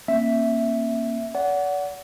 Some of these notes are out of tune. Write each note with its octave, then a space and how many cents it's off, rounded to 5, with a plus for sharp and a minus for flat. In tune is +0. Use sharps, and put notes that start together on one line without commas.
A#3 +0 C#4 -40 E5 +0
D5 -40 F#5 +0